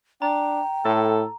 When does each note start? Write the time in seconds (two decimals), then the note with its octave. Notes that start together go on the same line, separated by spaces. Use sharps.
0.22 D4 G5 A#5
0.85 A2 A4